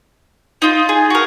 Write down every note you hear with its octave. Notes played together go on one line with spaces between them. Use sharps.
D#4 F4
G#4
F#4 A#4